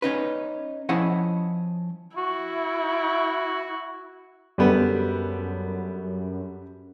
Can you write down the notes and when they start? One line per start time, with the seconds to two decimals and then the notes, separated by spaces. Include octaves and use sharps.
0.02 C#4 D#4 B4
0.89 F3 C#4 E4 D#5 F#5
2.18 E4 F#4
4.58 F#2 D3 G3 B3